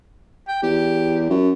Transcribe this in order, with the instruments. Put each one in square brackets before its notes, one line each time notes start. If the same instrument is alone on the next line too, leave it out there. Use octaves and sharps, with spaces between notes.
[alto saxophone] G5
[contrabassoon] E2 [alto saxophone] G4
[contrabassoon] F#2